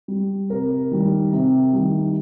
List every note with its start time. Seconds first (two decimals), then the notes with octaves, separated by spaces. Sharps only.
0.08 G3
0.50 C3 A#4
0.91 D#3 G3
1.32 C3
1.73 D#3 G3